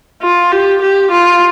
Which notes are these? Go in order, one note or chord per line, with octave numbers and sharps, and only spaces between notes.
F4
G4
G4
F4